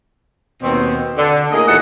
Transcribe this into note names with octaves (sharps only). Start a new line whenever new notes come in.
D#2 B2 C4
D3
A2 A#3 G#4 D#5
D#2 A#2 E3 D#4 A4 F#5